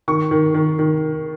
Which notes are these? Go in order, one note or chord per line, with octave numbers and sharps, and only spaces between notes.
D#3 C#6
D#3
D#3
D#3